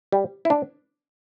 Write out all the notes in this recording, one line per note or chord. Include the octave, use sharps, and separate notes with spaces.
G3
E4
D4